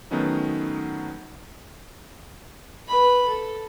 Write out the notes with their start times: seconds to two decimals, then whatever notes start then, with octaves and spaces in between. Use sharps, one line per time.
0.11 D#3 F#3 A3 B3 C#4 D#4
2.88 B4 B5
3.27 A4